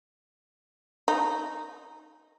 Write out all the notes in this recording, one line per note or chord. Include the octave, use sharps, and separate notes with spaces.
D#4